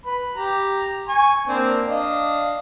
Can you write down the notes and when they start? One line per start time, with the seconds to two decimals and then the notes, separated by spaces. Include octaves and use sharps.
0.06 B4 B5
0.35 G4 A#5
1.08 G#5 C#6
1.48 A#3 C4 D4
1.87 D4 D#5 F5